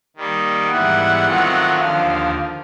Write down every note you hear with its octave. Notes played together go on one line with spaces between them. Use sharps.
D#3 G3 A#3 D#4
G#2 E3 G3 B3 E4 F#5
D#3 F#3 A3 C4 F4
D#2 D3 F3 F5